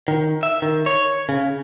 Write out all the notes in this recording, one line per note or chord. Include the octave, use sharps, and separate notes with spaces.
D#3
E5
D#3
C#5
C#3